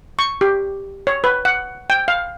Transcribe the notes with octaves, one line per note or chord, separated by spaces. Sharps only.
C#6
G4
C#5
B4
F#5
G5
F5